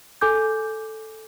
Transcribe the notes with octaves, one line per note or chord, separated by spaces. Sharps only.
A4 G#5 D6 G6